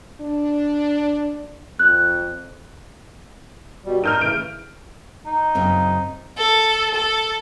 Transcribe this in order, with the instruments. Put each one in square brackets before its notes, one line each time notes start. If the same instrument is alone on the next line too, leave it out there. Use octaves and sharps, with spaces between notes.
[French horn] D4
[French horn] F2 [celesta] F#6
[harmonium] B2 G3
[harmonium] D#4 A#4 [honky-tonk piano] F6 G6 D#7
[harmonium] C#3 E3 A3 [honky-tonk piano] D7
[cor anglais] D#4
[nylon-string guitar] F#2 C#3 C4
[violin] A4
A4